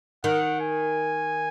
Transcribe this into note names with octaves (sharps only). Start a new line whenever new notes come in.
D#3 F#5
G#5